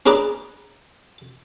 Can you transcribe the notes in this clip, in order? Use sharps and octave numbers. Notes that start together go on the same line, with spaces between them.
C#4 D4 G#4 B4 D5 A#5